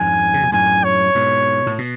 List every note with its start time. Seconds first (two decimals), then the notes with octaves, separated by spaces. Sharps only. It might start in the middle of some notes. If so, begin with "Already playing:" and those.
Already playing: F2 G#2 G#5
0.34 C#3
0.43 B2
0.52 F#2 A2 G#5
0.84 C#5
1.15 G#2 B2
1.67 A2
1.78 B2